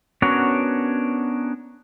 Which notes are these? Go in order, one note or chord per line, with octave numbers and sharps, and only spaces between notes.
B3 C#4 D4 F#4 A#4 C#5